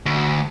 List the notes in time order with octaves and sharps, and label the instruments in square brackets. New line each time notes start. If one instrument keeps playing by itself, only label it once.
[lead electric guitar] D2